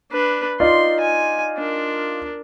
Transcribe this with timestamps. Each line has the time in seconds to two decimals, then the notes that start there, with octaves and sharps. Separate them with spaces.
0.11 D4 B4
0.60 D#4 F4 D5 C6
1.00 G#5
1.58 D4 A#4